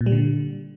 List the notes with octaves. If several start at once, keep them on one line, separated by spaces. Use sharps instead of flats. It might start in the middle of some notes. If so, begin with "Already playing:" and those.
A#2
G3
D3